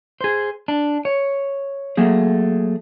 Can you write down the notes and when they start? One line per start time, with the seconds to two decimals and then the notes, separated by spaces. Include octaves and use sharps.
0.21 G#4 C5
0.68 D4
1.05 C#5
1.97 F#3 A3 A#3 G#4